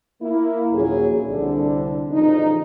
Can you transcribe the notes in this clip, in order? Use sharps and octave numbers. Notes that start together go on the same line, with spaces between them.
A#3 E4
A#1 D#2 A#2 F#3 C#4 G#4
C2 D3 D4
A1 C#3 F3 D#4